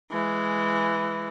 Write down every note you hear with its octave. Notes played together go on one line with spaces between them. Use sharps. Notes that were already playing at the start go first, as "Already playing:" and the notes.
E3 G#3